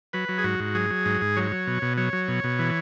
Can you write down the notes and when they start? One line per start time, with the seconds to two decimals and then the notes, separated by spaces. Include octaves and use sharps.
0.13 F#3 B4
0.29 F#3
0.38 G#4
0.44 G#2 F#4
0.60 G#2
0.75 F#3 G#4
0.90 F#3
1.05 G#2
1.21 G#2
1.36 F#3 C#5
1.52 F#3
1.67 B2
1.82 B2
1.97 F#3 C#5
2.13 F#3
2.28 B2
2.44 B2
2.59 E3